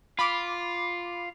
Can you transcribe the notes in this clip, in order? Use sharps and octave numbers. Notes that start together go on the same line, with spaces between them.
F4 B5 D6